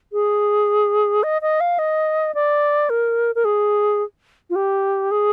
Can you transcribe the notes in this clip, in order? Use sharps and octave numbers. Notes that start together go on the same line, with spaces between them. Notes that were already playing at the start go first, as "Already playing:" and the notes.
G#4
D#5
D#5
F5
D#5
D5
A#4
A#4
G#4
F4
G4
G#4